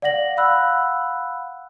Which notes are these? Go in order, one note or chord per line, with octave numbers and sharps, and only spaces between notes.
D5 F5 F#5 A#6 F#7
F5 F#5 B5 E6 F#6